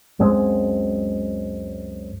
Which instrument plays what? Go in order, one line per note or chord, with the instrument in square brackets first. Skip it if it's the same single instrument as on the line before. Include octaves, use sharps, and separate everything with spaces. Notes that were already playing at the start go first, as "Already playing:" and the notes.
[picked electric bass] C#2 F#2 G#3 C4